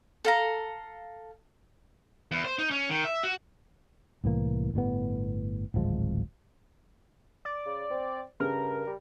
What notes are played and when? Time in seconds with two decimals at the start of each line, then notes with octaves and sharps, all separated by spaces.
0.25 A4 F5 A#5
2.31 E2
2.45 C5
2.58 D#4
2.71 C#4
2.90 D#3
3.05 E5
3.23 F#4
4.24 C2 A2 E3 A#3
4.74 G1 A2 G3 B3
5.74 D1 G#1 F3 G#3
7.45 D5
7.66 C#3
7.90 C4 C5
8.40 G2 C#3 G#4 A#4
8.87 G3